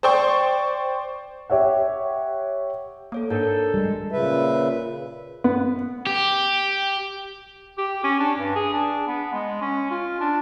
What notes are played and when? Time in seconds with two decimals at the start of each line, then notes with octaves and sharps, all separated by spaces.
0.03 C5 D5 G5 C6 C#6
1.50 G4 C#5 E5 F#5
3.12 A#3 A4 C#5 D#6
3.30 G#2 D4 A4 A#4 G6
3.74 G3 G#3
4.12 A#2 C#3 B4 E5
5.44 B3
6.07 G4
7.78 G4
8.04 C#4
8.20 D4
8.39 G2
8.55 G#4
8.73 D4
9.07 B3
9.33 G#3
9.61 C#4
9.91 F4
10.20 D4